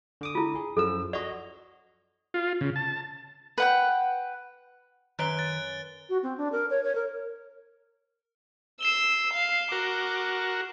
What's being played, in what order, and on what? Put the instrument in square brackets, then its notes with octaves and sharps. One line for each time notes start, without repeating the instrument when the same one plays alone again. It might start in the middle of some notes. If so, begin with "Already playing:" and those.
[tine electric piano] D3 D6 D#6
[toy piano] E4 F4
[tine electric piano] G#4
[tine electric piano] F#2 F3 E6 [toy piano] A4
[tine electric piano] F#4 D#5 [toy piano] D5 C#6
[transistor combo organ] F4
C#3
A5
[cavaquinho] B4 F#5 G5
[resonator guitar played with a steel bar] F#2 B4 C#5 [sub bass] D#3 [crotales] F#6 D7 G7
[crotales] F#6 A6
[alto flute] F#4
C4
D4
A#4
C#5
C#5
A#4
[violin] E6 [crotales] C7 E7 G7
[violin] F5
[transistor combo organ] F#4 A#4 [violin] D6